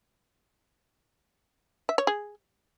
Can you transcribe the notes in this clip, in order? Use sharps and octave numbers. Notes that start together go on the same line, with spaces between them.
E5
C#5
G#4